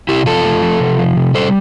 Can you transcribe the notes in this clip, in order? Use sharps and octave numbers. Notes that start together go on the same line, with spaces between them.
C3 E4 G4
F3 F4 A4
A3
F3
C3
F3
C3
G3 A4 C5